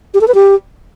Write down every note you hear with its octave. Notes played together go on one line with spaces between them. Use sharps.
G4
A4
B4
G4